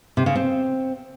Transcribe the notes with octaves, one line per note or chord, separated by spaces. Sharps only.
C3
C#3
C4